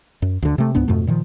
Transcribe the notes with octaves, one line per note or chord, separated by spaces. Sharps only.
F#2
D2 D3
C3 A3
C#2 G#2 B3 D4
F2 G#2 B2 A3
A#2 D#3 F3